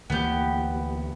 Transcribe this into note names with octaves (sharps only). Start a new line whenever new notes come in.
D2 E3 A#3 B3 G4